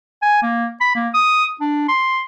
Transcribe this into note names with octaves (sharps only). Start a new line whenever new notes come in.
G#5
A#3
B5
A#3
D#6
D4
C6